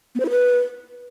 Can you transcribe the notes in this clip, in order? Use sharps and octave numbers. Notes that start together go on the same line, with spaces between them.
B3
C5
E4
B4